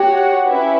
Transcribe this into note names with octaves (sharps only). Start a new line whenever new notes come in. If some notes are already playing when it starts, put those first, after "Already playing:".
Already playing: F#4 G4 C#5 F#5 G5
C#4 E4 B4 E5